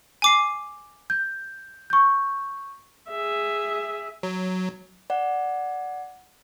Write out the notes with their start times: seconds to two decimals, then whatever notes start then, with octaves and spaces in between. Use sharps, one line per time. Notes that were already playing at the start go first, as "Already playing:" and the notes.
0.22 G#5 D6 C7
1.10 G6
1.90 C#6 G6
3.10 G#4 E5
4.23 F#3
5.10 D5 F#5